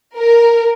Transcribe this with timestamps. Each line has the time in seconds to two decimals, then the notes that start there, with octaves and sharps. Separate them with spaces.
0.17 A#4